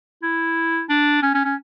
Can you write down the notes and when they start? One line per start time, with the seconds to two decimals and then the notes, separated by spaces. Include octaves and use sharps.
0.23 E4
0.89 D4
1.23 C#4
1.35 C#4
1.45 C#4